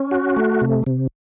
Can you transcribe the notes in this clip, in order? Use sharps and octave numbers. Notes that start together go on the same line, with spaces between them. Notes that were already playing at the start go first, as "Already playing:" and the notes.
Already playing: C#4
F#4
A3
C3
C3